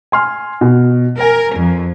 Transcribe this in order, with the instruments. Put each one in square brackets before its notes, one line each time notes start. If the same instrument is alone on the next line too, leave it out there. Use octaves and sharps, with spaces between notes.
[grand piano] G#5 C6 F6
B2
[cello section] A#4 [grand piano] G#5
[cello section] F2